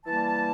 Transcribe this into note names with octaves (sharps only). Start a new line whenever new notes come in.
E3 G3 A#3 A5